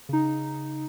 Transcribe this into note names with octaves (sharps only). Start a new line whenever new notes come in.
C#3 D#4